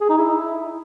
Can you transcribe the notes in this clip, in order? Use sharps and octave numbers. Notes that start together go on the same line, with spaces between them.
G#4
D#4
E4